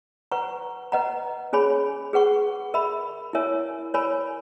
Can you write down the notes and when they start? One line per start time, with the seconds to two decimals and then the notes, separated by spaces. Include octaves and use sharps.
0.32 B4 F#5 A#5 C#6
0.92 B4 D#5 F#5 A#5
1.53 C#4 G#4 C#5 G#5 B5
2.13 G#4 B4 F#5 C#6
2.74 A#4 E5 B5
3.33 E4 A#4 C#5 E5 G#5
3.94 A#4 C#5 G#5 B5